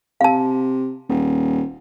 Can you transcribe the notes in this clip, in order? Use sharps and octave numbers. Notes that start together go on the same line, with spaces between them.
C3 F5 A5
D#1